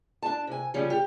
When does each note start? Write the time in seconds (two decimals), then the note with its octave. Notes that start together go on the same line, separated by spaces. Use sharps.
0.22 D4 A5
0.47 C3 G#5
0.74 C#3 F3 G3 C#4
0.90 G4